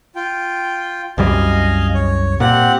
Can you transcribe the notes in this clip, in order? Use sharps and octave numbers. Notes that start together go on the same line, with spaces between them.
F4 G5
C2 F#2 G3 D#5 F5 G#5
C#5
A#2 C4 G4 F#5